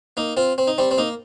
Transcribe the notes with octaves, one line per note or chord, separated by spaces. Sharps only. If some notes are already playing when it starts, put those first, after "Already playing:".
A#3 D#4
C4 F4
C4
D#4
G3 C4
C4
A#3 D#4